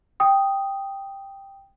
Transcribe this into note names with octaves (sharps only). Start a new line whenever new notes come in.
G5 D#6